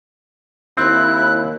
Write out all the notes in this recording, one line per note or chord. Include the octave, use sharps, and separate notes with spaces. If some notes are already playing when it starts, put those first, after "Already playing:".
D#2 C4 E4 F#6